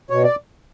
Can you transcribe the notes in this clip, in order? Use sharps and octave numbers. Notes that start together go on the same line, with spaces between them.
B2 C#5
D5